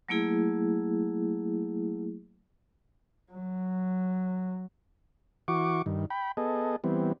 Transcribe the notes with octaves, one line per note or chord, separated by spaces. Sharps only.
F#3 A3 A#3 E4 G#4
F#3
E3 F#4 C#6 D6
G2 D#3
G5 B5
B3 G#4 A4 D#5
E3 G3 B3 C4